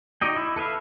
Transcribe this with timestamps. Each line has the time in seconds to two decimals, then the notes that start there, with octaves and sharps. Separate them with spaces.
0.21 D#4 F#4 D5 D#5 G5
0.36 E4
0.56 A4 B4 E5 F5